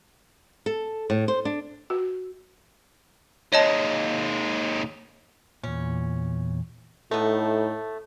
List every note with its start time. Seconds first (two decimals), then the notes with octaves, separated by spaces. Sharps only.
0.66 A4
1.10 A2
1.28 C5
1.45 D4
1.90 F#4
3.53 D#2 G#3 C#5 D#5 A5
5.63 E2 A#2 C#4
7.11 A2 A3 B3 D#4 A4